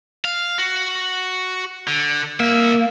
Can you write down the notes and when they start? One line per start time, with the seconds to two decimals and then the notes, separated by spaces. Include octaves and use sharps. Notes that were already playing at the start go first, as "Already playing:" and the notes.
0.25 F5
0.58 F#4
1.87 D3
2.40 C2 A#3 E5